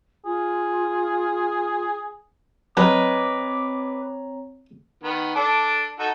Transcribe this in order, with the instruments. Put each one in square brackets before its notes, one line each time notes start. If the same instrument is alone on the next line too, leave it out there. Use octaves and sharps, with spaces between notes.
[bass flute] F4 [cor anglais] G#4
[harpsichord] F#3 [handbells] C4 C#5 A#5 [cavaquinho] B4 D#5 [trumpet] D6
[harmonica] D#3 B3
D4 A4 D6
D#4 F#4 A4